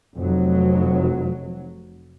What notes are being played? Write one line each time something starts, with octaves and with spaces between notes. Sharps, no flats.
F1 F#3